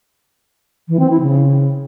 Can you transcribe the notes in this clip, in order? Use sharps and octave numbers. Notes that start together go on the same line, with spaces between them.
E3
C4
E4
C#3